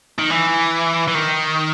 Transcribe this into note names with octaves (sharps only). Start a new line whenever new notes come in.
D#3
E3
E3
D#3